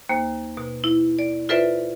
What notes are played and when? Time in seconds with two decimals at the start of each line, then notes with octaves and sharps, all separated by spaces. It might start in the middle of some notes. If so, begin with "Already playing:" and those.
0.09 D#2 A#3 C5
0.57 B2
0.84 E4
1.19 D5
1.49 F4 A4 B4 C5 D5 E5